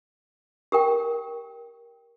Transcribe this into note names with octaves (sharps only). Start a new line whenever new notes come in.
G4 A#4 G5